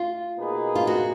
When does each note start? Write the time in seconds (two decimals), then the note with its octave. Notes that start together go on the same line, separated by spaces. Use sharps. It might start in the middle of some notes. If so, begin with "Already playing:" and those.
Already playing: F4
0.38 B2 A#3 D#4 G#4 B4
0.75 F4
0.87 F#4